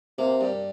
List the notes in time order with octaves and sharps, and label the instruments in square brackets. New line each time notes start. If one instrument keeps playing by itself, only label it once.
[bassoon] C3 [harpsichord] A#3
[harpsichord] G2